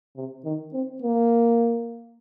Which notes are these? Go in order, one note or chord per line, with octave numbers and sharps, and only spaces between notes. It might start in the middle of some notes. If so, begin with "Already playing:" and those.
C3
D#3
C4
A#3